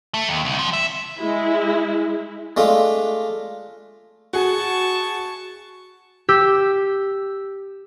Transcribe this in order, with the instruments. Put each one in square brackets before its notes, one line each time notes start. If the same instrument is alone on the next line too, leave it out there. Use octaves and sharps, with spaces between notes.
[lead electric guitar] A3
D#2
C2
F3
E5
[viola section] G#3 E4
[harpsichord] G#3 A3 D4 F4
[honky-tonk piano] F#4 G#4 [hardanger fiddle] A5 C#6
[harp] G4 E6